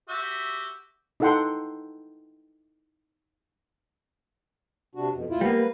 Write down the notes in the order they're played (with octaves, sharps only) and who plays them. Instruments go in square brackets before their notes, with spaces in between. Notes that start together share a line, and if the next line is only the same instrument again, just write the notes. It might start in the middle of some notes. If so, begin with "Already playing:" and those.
[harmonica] F#4 G4 E5
[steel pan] D#4 E4 A4 F#5 G5 C6
[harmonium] C3 D4 F#4
F2 B2
D2 E4 F4
[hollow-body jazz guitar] G3 A#3 [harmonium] B3 B4
[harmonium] B4